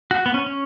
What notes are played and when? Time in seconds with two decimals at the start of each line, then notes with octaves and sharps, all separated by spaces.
0.11 F#4
0.26 B3
0.34 C#4
0.46 C#4